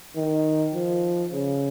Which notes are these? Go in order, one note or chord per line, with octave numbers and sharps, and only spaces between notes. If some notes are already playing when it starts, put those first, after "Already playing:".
D#3
F3
C#3